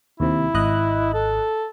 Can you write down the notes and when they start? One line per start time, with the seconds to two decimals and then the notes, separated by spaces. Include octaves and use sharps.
0.20 D#2 C3 E4
0.54 G#1 D#5 F#6
1.14 A4